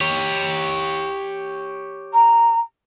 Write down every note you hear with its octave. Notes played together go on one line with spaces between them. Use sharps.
G4 C#5
A#5